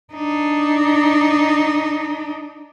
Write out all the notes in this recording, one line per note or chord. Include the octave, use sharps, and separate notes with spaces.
D4 D#4